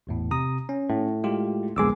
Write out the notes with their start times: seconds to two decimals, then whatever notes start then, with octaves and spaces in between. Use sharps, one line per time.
0.07 G#1 E2 A2
0.31 C3 A#5 D#6
0.69 C#4
0.90 A2
1.24 G#3 F4 G4
1.76 D1 A#1 G#3 B3 D6 E6